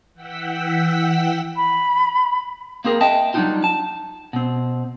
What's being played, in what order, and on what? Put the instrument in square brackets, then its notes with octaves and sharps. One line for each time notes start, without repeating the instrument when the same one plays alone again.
[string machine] E3 F#5 G5 E6 B6
[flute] B5
[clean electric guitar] A#3 C4 G#4 A#4
D#5 E5 G5 A5
F#3 G3 C4 D4 D#4 F4
A5
B2 C4